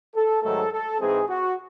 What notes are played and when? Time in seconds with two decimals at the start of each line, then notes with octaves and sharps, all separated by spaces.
0.14 A4
0.43 G#2 D#3 F#3 A3 A4
0.72 A4
1.00 G#2 E3 G#3 C4 G#4
1.28 F#4